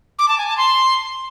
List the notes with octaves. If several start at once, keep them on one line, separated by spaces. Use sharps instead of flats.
D6
A5
G#5
A5
C6